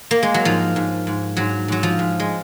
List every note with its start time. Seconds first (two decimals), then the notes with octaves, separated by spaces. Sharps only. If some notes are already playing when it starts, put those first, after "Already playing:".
0.11 A#3
0.23 G#3
0.34 F#3
0.45 G#2 F3
0.76 G#2
1.07 G#2
1.37 G#2 F#3
1.68 G#2 F#3
1.83 F3
1.99 G#2
2.20 G#3